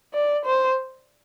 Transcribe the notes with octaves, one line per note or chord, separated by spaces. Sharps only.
D5
C5